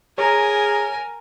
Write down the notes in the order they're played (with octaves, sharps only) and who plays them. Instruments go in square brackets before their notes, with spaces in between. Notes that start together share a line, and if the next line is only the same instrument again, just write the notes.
[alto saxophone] G#4 [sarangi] A#4 [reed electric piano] C#5 A#5 [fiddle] G#5